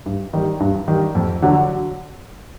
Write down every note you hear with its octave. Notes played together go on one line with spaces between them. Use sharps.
G2
D#3 G3
G2
D#3 G3
F2
D3 F#3